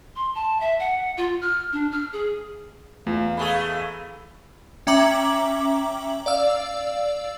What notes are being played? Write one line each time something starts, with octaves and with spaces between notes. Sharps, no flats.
C6
A5
E5
F#5
F4
F6
D4
F6
G#4
E2 A3 F4 F5
G#3 A3 G#4 B5
C#4 E5 G5 A#5 D6 F#7
D5 F5 E6